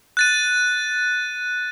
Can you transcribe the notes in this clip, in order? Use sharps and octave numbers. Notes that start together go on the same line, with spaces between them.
F#6 A6 D#7